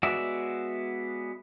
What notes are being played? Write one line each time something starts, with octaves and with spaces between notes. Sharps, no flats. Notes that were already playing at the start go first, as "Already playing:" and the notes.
G#3 B3 F#4 D5 E5